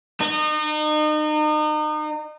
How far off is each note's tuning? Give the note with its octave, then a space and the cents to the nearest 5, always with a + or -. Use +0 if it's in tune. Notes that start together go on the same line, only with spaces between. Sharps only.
D#4 -35